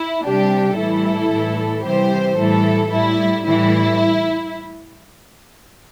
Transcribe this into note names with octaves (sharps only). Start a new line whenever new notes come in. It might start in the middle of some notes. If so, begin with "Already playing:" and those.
Already playing: E4
C3 G3 D4 G4
A2 E3 G3 E4 A4
A2 E3 G3
C3 E3 G3 G4 C5
A2 E3 G3 E4 A4
A2 G3 E4
A2 E3 G3 E4